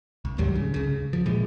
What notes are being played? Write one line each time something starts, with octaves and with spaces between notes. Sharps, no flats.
C2
D#2 G#2 F#3 G3
C#3
C#2 C#3
F3
A#2 E3 F3 G#3